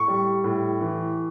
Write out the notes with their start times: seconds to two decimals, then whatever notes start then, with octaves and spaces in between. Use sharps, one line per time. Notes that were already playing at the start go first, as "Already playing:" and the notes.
Already playing: A2 C#6
0.08 G3
0.44 A2
0.81 E3